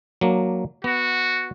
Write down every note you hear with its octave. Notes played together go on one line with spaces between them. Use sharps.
F#3 A#3 D4
B3 F#4